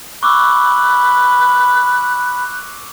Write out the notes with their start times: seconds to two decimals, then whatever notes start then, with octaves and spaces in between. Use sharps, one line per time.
0.23 B5 C#6 D6 E6 F#6